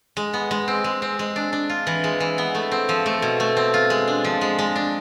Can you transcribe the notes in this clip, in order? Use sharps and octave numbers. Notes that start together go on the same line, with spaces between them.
G#3
B3
G#3
C4
G#3
C4
G#3
D4
D4
F4
E3
G#3
E3
B3
A3
C4
F3
A3
B2
A3
C4
F4
G#3
D4
F3
G#3
G#3
D4